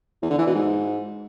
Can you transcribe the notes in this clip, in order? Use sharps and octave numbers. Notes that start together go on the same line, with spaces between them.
E2
D3
E3
B2
G#2